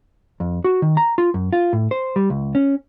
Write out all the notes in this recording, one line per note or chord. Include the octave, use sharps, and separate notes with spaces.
F2
F#4
D#3
A#5
F4
F#2
F4
A2
C5
G3
C#2
C#4